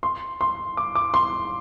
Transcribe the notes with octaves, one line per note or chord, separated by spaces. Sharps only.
C6
C6
D6
D6
C6